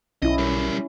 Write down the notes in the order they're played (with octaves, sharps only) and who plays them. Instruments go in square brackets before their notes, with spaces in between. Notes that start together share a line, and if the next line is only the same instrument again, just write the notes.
[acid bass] B1 [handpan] C#4 E4 [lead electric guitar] D#5
[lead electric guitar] G3 A#4